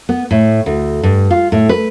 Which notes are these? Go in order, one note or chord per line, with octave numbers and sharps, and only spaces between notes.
B3
A2
D2
G2
F4
A2
B4